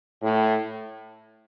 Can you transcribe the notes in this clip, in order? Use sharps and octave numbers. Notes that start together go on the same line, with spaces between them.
A2